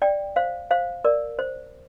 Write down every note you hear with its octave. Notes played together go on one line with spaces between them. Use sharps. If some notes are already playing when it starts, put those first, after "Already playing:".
D5 G5
C5 F5
C5 F5
A#4 D5
C5